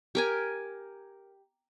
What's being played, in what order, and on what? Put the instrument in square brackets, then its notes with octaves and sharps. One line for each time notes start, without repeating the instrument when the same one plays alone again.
[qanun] G4 A#4 G#5